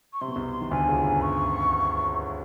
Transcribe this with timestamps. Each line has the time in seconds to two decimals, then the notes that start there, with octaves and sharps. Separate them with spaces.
0.13 C#6
0.21 C3 C6
0.28 B2
0.36 C2 C3
0.61 D#3
0.71 D2 D3 G#5
0.88 C#2 C#3
1.05 G2
1.21 C#6